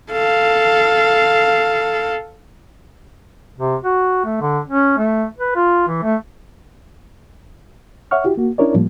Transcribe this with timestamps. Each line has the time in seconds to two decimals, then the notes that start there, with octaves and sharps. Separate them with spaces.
0.12 A4 F5
3.58 C3
3.84 F#4
4.25 A3
4.41 D3
4.68 C#4
4.98 A3
5.38 B4
5.55 F4
5.88 E3
6.03 A3
8.11 C#5 E5 F#5 C#6 F6
8.24 E4 F#4 G4
8.37 A#3 F#4
8.58 C#4 D4 E4 A#4 C#5 D5
8.74 A2 F3 G3 A#3